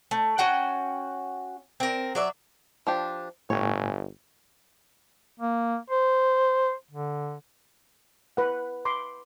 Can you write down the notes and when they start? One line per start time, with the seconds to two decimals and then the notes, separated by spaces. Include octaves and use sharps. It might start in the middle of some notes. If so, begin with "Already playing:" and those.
0.11 A3
0.38 C#4 F#4 F#5 G5
1.80 C4 A#4
2.15 F#3 D5 E5
2.87 F3 D4 G4
3.50 G1 A2 C#5 G5 G#5
5.40 A#3
5.90 C5
6.91 D3
8.37 B4 F#5
8.85 B5 C6 D6